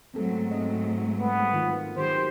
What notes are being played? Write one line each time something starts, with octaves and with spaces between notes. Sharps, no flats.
G#2 F#3 A3 B3 C4 A4
C4 D#5
B3
D#3 F4
D#3 F#3 G4 C5